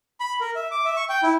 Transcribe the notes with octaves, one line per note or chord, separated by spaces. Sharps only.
B5
A#4
E5
D6
E5
C#6
G5
E4